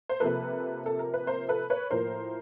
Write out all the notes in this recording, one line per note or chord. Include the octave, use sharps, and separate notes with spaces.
C5
C3 F3 A#3 A4 B4
A4
A#4
B4
A#4 C5
A4 B4
B4 C#5
A2 F3 A#3 A#4 C5